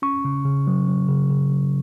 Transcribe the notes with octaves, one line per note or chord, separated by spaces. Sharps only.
C#4 C#6
C#3
C#3
F#3
F#3
C#3
C#3
F#3